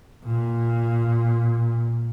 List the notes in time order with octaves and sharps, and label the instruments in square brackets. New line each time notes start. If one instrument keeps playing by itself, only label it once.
[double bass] A#2